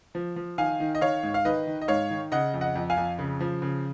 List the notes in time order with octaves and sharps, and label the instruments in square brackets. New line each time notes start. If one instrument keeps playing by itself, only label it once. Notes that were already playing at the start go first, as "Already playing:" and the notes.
[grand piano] F3
F3
D#3 F5 G#5
D#3
D#5
D#3 C#5 F5
G#2
F5
D#3 B4 D#5
D#3
D#5
G#2 C#5 F5
D#3
C#3 D#5 F#5
F2
D#5 F#5
F2
F5 G#5
F2
C#3
F3
C#3